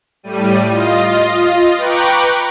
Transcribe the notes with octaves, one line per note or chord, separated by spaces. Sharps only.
A2 G3 D#7
F4 D#5
B4 G5 A#5 C#6 D6 F#6